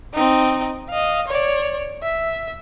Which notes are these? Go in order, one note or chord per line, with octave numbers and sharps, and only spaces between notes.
C4 D#4
D#5 F5
C#5 D5
E5